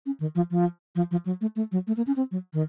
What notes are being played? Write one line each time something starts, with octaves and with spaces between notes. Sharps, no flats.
C#4
D#3
F3
F3
F3
F3
F#3
A3
A3
F#3
A3
A#3
C#4
C4
F#3
D#3